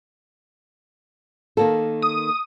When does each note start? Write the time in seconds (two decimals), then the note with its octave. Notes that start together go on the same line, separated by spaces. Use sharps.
1.57 D#3 A#3 A4
2.02 D#6